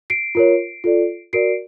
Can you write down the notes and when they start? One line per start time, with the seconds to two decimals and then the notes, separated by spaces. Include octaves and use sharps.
0.10 C7 D7
0.35 F4 A#4 C#5
0.84 F4 A4 D5
1.33 F#4 A#4 D5 C7 D7